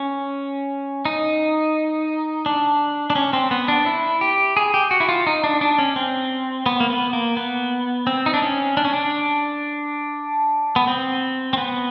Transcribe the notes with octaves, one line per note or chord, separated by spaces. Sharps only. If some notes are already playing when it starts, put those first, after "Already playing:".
Already playing: C#4
D#4
D4
D4
C#4
C4
B3
D4
E4
G4
G#4
G4
F#4
E4
F4
D#4
D4
D4
C#4
C4
B3
A#3
B3
A#3
B3
C4
D#4
D4
C#4
D4
C#4
D4
B3
C4
C4
B3